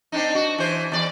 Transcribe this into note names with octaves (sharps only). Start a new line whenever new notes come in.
C4 D4 D#4
F#4
E3 C5
E2 D5